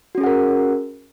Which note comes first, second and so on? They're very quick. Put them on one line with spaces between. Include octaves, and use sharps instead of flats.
F#4 C#4 G#4 F#5 A#4